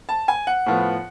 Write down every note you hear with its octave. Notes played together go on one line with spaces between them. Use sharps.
A5
G#5
F#5
A2 F3 B3